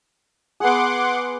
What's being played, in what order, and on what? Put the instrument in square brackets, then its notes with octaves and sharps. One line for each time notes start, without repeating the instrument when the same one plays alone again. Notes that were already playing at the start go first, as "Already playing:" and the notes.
[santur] B3 G#4 [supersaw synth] F#5 C6 D6